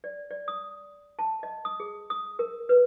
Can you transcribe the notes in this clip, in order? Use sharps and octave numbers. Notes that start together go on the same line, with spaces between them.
D5
D5
D#6
A5
D#5
D#6
G#4
D#6
A#4
B4